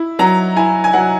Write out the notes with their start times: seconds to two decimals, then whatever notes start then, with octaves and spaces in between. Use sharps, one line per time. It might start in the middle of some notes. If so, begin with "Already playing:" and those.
Already playing: E4
0.19 F#3 A#5
0.56 E4 G#5
0.84 G#5
0.93 F#3 F#5